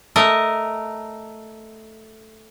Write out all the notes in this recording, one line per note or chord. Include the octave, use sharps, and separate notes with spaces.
A3 A#4 D#5